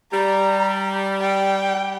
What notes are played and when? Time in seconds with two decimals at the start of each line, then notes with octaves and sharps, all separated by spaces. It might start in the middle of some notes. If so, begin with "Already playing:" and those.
0.12 G3 A#5
1.21 G5
1.76 G3